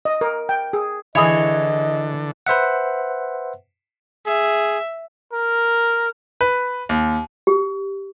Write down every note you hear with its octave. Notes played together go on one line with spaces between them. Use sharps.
D#5
A#4
G5
G#4
D3 E3 E4 G#4 C#5 D#5
B4 C5 E5 F#5
G#4 E5
A#4
B4
D#2
G4